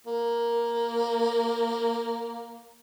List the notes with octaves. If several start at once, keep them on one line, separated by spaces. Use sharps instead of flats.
A#3 A#4